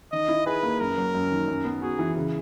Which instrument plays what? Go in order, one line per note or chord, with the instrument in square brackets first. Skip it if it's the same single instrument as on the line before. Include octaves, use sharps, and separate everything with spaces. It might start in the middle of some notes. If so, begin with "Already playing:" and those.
[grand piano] D#3 [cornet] D#5
[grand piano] E4
[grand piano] G#4 [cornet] B4
[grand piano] A#3
[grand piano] F#2 [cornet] A#4
[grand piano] F#3
F#2
D#3
F#2
B3
[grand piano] F#4 [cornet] G#4
[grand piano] E3
C#3